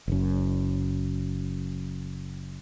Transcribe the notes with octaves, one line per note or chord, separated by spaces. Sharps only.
F#1 F#2